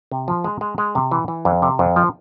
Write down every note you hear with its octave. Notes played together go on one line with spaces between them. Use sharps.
C3
F3
G#3
G#3
G#3
C3
E3
E3
F2
C3
F2
F3